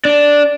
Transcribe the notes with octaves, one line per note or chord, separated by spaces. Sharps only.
D4